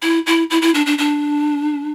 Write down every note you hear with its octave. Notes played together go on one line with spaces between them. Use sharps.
E4
E4
E4
E4
D4
D4
D4